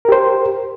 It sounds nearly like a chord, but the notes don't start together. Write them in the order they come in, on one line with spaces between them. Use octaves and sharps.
A#4 G4 C5